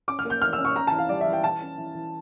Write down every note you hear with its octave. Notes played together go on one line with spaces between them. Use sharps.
C#4 D6
F6
A#3
G6
E3 F6
E6
C#4
C#6
C#4 A#5
A5
E3
F5
G3 D5
E5
E3
G5
E3 A5
C#4
E3
E3